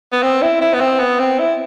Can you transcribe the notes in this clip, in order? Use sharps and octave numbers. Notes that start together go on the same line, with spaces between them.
B3
C4
E4
E4
B3
C4
B3
C4
E4